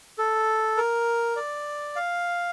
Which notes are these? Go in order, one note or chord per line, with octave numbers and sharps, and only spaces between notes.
A4
A#4
D5
F5